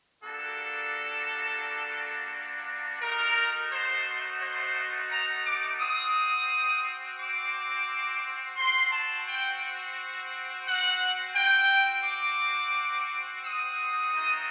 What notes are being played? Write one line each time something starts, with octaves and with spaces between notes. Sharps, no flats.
G3 A#3 D4 F#4 A4
A3 D#4 F#4 A#4
C5
C5
A#5
D6
C4 F#4 D#6
D6
C4 F#4 C6
A5
G5
F#5
C4 F#4 G5
D6
D#6
A3 C4 D#4 F#4